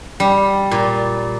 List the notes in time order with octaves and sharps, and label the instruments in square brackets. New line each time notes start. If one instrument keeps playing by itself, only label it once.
[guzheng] G3
A#2